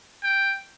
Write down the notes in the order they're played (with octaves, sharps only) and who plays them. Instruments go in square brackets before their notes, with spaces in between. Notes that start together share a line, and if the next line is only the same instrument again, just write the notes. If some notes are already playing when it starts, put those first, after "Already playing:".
[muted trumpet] G5